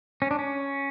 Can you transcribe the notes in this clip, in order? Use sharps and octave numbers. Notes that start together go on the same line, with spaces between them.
C#4
D4
C#4